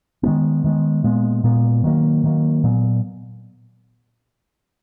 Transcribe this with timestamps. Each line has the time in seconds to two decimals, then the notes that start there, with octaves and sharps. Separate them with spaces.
0.23 D#3 G#3 B3
0.64 D#3 G#3 B3
1.04 A#2 G#3 B3
1.44 A#2 G#3 B3
1.84 D#3 F#3 A#3
2.24 D#3 F#3 A#3
2.64 A#2 F#3 B3